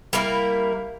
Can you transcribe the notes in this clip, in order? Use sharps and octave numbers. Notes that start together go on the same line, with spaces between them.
G3 A#3 E4 A#4